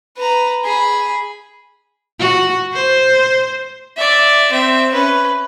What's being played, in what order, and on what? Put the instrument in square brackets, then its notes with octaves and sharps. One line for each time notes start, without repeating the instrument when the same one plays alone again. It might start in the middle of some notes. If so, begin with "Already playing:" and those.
[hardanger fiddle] B4 A#5
G#4 B5
[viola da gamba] F#4
C5
[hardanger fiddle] D5 E5
C4 E5
C#4 B4